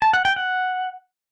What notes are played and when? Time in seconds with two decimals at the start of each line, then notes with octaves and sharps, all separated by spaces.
0.02 A5
0.13 F#5
0.25 G5
0.36 F#5